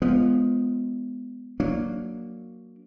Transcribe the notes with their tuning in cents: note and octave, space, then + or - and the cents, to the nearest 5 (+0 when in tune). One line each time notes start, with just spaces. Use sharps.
F3 +0 G#3 +0 B3 +15
F#3 +0 A#3 +0 D4 +0